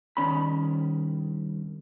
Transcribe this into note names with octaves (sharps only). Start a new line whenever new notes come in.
C2 D#3 C#4 B5